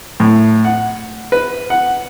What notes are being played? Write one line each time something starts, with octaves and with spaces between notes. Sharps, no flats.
A2
F#5
B4
F#5